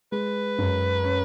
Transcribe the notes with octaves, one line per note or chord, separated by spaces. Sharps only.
G#3 B4
F#2
C#4